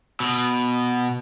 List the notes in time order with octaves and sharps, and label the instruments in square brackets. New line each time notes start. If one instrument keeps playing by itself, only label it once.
[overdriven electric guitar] B2